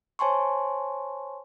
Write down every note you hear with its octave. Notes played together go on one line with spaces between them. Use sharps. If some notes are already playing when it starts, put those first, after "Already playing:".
C5 C#5 G#5 A5 C6 C#6